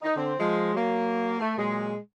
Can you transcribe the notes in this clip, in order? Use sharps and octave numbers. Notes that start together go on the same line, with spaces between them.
D#4
D3 C4
F3 G#3
F#3 A#3
A3
A#2 F#3 G#3